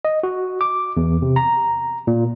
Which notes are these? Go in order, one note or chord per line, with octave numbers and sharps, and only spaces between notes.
D#5
F#4
D6
E2
C3
A#5
A#2